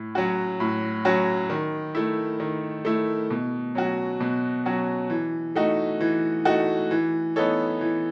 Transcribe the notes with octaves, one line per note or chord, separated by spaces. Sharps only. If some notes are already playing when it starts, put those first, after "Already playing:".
Already playing: A2
F#3 C#4 F#4
A2
F#3 C#4 F#4
D#3
A3 E4
D#3
A3 E4
B2
F#3 C#4 F#4
B2
F#3 C#4 F#4
E3
A3 D#4 F#4
E3
A3 D#4 F#4
E3
B3 D#4 A4 C#5
E3